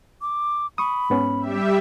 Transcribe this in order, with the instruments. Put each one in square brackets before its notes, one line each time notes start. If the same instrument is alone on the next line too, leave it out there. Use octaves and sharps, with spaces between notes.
[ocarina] D6
[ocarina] B5 [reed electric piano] C#6 D#6
[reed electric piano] G#2 B3 C#4
[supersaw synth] G3 G4 E5